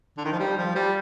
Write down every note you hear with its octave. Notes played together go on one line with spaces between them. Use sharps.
D3
D#3
F3
G3
F3
G3